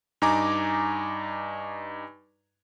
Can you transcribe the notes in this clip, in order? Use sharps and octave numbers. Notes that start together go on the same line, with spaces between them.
G2 D#4 G#5 A#5 D6